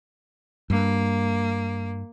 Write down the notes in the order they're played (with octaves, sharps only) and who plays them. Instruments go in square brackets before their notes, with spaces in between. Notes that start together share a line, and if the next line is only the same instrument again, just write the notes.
[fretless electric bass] G2 [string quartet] A#3